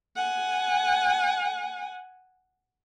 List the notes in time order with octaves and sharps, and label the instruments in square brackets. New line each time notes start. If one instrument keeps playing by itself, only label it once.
[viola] F#5 G#5